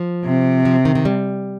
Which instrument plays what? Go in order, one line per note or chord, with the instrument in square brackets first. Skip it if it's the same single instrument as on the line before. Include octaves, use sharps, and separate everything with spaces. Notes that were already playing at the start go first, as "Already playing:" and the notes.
Already playing: [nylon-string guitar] F3
[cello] C3
[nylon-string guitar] F3
D#3
D#3
G3